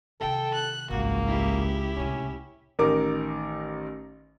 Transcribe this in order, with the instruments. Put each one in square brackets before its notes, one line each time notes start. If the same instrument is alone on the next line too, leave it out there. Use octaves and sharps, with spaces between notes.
[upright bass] C3 D#3 [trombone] A4 [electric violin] G5
[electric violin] F#6
[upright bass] G#1 G2 [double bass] C#2 [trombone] A#3 [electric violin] F#4
[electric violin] E4 G4
[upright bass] C2 A2 [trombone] C#4
[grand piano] A1 D#3 A#4 D6